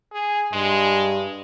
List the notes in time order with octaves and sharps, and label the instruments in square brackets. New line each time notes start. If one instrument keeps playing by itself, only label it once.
[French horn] G#4
[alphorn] G2 [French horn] G#3